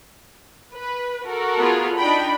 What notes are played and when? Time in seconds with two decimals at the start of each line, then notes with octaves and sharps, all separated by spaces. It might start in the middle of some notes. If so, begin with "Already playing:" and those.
0.73 B4
1.26 F#4 A4 A#4
1.59 B3 F4 G#4
1.97 D4 D#4 G5 B5